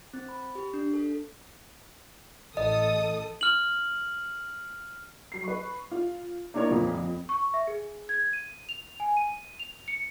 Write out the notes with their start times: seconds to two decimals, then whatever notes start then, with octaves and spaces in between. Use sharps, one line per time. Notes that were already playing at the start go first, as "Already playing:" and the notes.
0.13 C4
0.29 B5
0.55 G4
0.74 D4
0.94 A4
2.57 A1 A4 D#5 D#6
3.41 F6 F#7
5.32 F#3 C7
5.44 B4 C#6
5.91 F4
6.54 A#3 D4 E4 A#4 C#5 D5
6.68 F2 A#2 F3 A#3
6.94 F2
7.29 C#6
7.54 E5
7.67 G#4
8.09 G#6
8.33 D#7
8.69 F7
9.00 G#5
9.17 D#7
9.59 F7
9.88 C#7